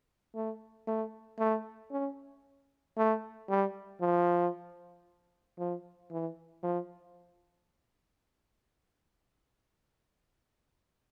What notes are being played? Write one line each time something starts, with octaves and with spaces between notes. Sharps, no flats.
A3
A3
A3
C#4
A3
G3
F3
F3
E3
F3